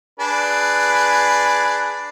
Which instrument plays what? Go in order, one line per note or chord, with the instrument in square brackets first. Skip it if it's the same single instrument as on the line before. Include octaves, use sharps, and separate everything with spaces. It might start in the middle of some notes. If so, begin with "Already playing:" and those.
[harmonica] D4 G#4 B4